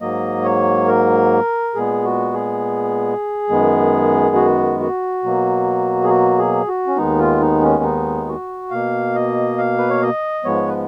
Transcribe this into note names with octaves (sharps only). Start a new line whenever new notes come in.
G#2 F#3 A#3 D#5
C#5
A#4
A#2 G#3 B3 G#4
F#4
G#4
F#2 D#3 G#3 B3
F#4
F#4
B2 F#3 A#3
G#4
F#4
G#4
F#4
C#4
D#2 D#3 G#3 B3 D#4
F4
D#4
C#4
D#4
F#4
B2 A#3 F5
D#5
F5
B4
C#5
D#5
G#2 F3 G#3 B3 C#5
B4